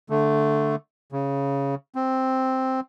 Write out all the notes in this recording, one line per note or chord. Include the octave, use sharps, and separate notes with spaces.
D3 A3
C#3
C4